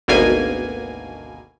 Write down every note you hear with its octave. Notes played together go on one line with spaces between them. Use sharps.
G#1 D2 B2 A#3 G#5